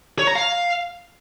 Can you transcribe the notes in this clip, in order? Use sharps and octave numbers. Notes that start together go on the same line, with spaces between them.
C#5
A#5
F5